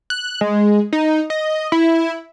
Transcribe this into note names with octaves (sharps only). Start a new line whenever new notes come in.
F#6
G#3
D#4
D#5
E4